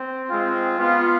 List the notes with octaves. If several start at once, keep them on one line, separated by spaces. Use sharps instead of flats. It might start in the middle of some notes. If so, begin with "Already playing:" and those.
Already playing: C4
G#3 C4 F4
B3 F4